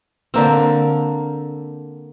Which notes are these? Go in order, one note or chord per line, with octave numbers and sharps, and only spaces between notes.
D3 A#3 C4